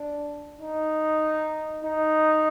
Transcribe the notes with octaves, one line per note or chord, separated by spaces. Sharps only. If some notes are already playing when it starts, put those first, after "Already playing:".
Already playing: D4
D#4
D#4